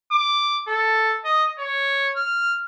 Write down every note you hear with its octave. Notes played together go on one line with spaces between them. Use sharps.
D6
A4
D#5
C#5
F6